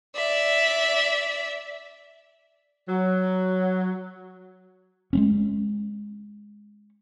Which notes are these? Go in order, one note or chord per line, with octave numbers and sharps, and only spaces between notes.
D5 E5
F#3
G#3 B3 C#4